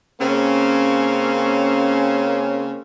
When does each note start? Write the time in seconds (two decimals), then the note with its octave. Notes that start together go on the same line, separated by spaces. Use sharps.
0.20 C#3 A#3 C4 C#4